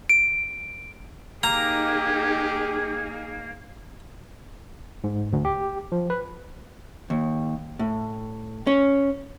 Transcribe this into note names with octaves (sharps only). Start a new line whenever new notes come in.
D7
A#3 D#4 G4 G#4 A#5
G#2
D2
G4
F3
B4
D#2
A2
C#4